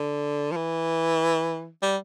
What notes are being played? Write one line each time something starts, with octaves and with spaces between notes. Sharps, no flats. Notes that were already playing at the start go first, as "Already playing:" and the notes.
Already playing: D3
F3
E3
G3